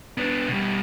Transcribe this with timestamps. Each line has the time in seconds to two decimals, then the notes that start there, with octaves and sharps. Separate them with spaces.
0.18 B3 D4
0.48 B2 G3